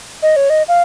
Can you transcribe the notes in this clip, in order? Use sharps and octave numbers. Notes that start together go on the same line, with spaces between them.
D#5
C#5
D#5
F5